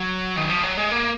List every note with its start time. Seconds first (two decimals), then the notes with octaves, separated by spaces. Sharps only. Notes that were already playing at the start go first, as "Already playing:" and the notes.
Already playing: F#3
0.36 D#3
0.49 F3
0.63 F#3
0.77 G#3
0.91 A#3